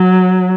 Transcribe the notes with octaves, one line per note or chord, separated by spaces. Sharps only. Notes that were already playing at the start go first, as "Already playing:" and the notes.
Already playing: F#3